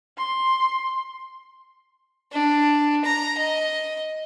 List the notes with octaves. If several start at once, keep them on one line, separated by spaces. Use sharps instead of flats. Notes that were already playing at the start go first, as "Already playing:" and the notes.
C6
D4
A#5
D#5